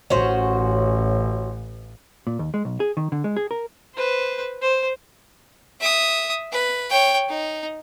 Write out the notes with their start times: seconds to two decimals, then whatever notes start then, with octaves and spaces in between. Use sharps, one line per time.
0.10 A1 C#4 F#4 C5
2.27 A#2
2.39 D#2
2.54 G#3
2.65 B1
2.80 G#4
2.97 D#3
3.12 D3
3.24 G#3
3.37 G#4
3.51 A#4
3.95 B4 C5
4.62 C5
5.81 E5 D#6
6.52 B4
6.90 C#5 G5
7.29 D#4